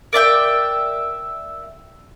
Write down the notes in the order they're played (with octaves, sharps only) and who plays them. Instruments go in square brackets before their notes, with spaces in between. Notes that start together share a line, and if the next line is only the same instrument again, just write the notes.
[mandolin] A#4 D5 E5 G5